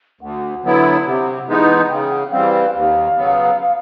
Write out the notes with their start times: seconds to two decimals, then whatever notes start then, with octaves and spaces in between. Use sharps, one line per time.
0.21 D2 F#5
0.63 D3 F#3 B3 E4
1.05 C3
1.48 E3 G#3 B3 D#4
1.90 C#3 G5
2.12 F#5
2.25 F#5
2.32 E3 G3 C4 F5
2.54 F5
2.74 D#2 F5
3.17 C#3 F#3 B3